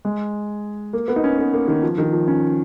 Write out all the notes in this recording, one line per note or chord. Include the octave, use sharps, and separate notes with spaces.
G#3
A#3
B3
D#4
C#4
B3
A#3
D#3
F3
D#3
F3
C#4